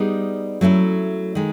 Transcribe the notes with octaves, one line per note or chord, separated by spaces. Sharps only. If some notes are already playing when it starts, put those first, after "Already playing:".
Already playing: G3 B3 D#4 G#4
F#3 A3 C#4 E4
D#3 G#3